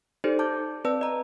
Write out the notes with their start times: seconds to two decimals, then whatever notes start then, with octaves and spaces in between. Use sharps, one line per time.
0.24 D#4 G4 A4 C5 D5
0.39 A5 D6 G6
0.85 C4 B4 D5 A5 E6
1.01 D#5 A#5